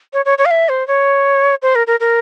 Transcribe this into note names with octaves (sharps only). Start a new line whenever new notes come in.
C#5
C#5
C#5
F5
E5
C5
C#5
C5
A#4
A#4
A#4